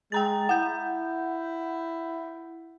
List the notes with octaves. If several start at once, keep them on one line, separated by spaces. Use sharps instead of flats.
G#3 G5 A#5 A6
E4 F#5 G6